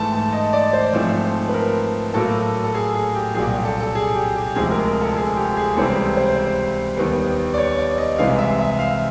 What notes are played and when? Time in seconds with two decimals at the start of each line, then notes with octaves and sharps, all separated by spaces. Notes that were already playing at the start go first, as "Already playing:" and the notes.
Already playing: G#2 E3 A3 A5
0.13 A5
0.33 D#5
0.53 D5
0.73 C5
0.93 G#2 F3 A3 C4
1.48 B4
1.54 A#4
2.14 A2 F#3 A#3 A4
2.64 A4
2.75 G#4
2.95 G#4
3.14 G4
3.34 C2 A#2 F#3 G#4
3.50 G4
3.65 A4
3.80 A4
3.95 G#4
4.15 G4
4.35 G4
4.56 D2 C3 F3 G#3 G#4
4.71 A#4
4.86 A#4
5.01 A4
5.16 G#4
5.36 G4
5.57 G#4
5.76 C#2 C3 E3 G3 C4 A4
6.17 C5
6.97 D#2 D#3 G3 B3
7.54 D5
7.58 C#5
7.78 D5
7.98 D#5
8.18 C2 C3 E3 G#3 F5
8.38 E5
8.59 E5
8.79 F5